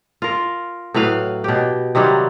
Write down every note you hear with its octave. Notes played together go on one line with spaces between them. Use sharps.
F4 A#4
A2 F#3 B4 F5
B2 G4
C3 D#3 F#3 G3